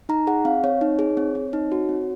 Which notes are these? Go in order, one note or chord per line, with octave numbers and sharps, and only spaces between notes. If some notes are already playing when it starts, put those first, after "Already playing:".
D#4 A#5
G#4 F#5
C4 F5
C4 C#5
D#4
G#4
C4
C4
D#4
F#4
C4